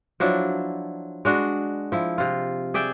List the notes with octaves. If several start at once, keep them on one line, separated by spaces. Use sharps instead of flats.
F3 F#3 D4 E4
G#3 D4 F#4
F3 E4
C3 F4
G#4 D5 E5 G5